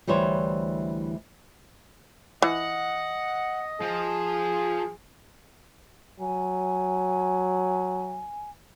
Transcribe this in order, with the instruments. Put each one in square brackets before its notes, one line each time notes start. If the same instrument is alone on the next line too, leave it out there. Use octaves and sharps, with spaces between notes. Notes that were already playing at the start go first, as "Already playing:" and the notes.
[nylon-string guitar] D2 E3 G3 C5 C#5
[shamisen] E3 [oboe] D#5 [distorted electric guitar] F#5
[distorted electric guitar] F3 [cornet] G#4
[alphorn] F#3 [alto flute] G#5